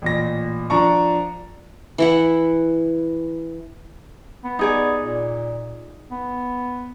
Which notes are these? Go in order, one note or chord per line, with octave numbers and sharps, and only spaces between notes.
A1 A#2 A#6
F3 D4 A#5 C#6
E3 E4 F#5
B3
D#4 G#4 D5
A#2
B3